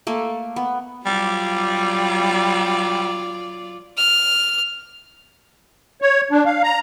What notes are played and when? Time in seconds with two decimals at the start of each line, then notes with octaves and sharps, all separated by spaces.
0.07 A3 A#3
0.56 B3
1.06 F#3 G3 F4 D5
3.97 F6
6.02 C#5
6.31 D4
6.46 F5
6.63 A#5